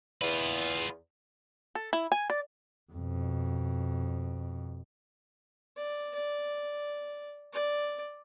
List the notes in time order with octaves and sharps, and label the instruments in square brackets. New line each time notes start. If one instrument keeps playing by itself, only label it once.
[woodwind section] E2 [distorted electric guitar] F4 B4
[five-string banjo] A4
E4
G#5
D5
[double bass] F2 B2
[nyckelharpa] D5
D5
D5